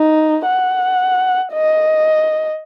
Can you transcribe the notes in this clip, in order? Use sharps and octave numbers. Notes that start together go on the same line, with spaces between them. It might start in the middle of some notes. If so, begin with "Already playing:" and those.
Already playing: D#4
F#5
D#5